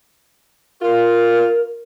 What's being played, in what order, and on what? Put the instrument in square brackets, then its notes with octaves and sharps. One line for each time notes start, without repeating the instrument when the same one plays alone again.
[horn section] F4 [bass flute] A#4